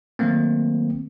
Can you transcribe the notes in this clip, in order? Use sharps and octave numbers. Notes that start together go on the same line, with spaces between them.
D#3 F#3 A3 A#3 C4